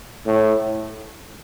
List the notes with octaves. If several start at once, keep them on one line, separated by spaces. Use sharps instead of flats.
A2